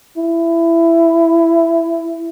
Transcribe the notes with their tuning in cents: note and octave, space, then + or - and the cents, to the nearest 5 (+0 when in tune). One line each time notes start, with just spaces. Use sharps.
E4 +15